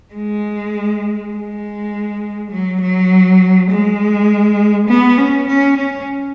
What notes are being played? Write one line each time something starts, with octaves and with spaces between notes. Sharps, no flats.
G#3
G#3
F#3
F#3
G#3
B3
C#4
C#4
C#4